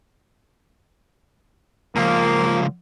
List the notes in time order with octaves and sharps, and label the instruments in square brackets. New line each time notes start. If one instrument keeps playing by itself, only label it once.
[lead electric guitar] C#2 F3 [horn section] A#3